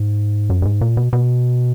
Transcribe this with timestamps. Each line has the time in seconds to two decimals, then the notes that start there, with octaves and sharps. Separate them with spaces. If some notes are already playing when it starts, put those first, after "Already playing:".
Already playing: G#2
0.50 F#2
0.62 G2
0.65 G#2
0.81 A#2
0.97 B2
1.13 B2